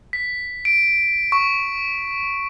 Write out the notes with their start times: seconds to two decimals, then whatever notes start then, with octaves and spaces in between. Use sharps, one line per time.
0.13 B6
0.65 D7
1.32 C#6